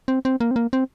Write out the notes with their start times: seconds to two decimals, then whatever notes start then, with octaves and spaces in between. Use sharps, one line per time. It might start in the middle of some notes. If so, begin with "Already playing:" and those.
0.08 C4
0.25 C4
0.40 A#3
0.51 C4
0.56 A#3
0.73 C4